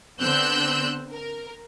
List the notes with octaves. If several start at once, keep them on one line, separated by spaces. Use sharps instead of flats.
D3 B3 C4 E6 F#6 G6
A#4